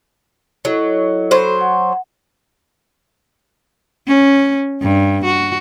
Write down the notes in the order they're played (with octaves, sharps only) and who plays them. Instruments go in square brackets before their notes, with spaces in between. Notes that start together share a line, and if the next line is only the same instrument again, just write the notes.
[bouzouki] F#3 [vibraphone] E4 A4 D#5
[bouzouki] F#3 C5 [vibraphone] A4 B5
[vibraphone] F#5
[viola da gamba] C#4
G2
F#4